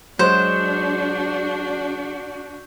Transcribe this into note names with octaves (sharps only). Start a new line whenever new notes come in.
F#3 G#3 D4 F#4 C5 G6 E7